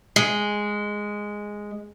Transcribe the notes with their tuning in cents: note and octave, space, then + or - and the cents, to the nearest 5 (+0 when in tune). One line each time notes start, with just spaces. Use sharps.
G#3 -5